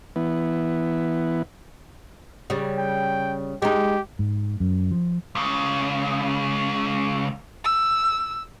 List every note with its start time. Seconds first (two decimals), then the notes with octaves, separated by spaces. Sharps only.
0.16 E3 B3
2.50 C#3 G3
2.78 G5
3.62 G#3 D#4 G4
4.19 G#2
4.60 F#2
4.91 F3
5.35 C#2 C#3
7.64 E6